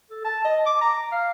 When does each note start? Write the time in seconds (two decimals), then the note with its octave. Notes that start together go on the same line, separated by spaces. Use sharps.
0.10 A4
0.25 A5
0.44 D#5
0.66 D6
0.81 A#5
1.12 F5